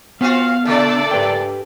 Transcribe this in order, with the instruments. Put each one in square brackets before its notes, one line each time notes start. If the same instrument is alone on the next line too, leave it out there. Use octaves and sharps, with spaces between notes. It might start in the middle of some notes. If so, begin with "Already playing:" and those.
[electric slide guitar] B3 [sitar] C4 F4 F#4 [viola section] F5
[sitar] A#2 C#3 A3 [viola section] D4 A4 D5
[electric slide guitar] G4 B4 G5